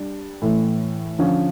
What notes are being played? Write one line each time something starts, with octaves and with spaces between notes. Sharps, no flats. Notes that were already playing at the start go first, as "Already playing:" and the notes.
Already playing: G3 D4
A2 E3 A3
D3 F3 C#4